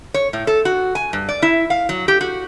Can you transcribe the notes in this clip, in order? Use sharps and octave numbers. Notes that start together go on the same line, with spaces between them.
C#5
A2
A4
F#4
G#5
G2
D5
E4
F5
F#3
G4
F#4